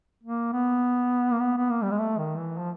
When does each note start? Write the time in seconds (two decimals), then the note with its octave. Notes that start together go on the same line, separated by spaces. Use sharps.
0.24 A#3
0.53 B3
1.33 A#3
1.40 B3
1.57 B3
1.70 A#3
1.83 G3
1.91 G#3
1.99 A3
2.18 D#3
2.38 E3
2.58 F3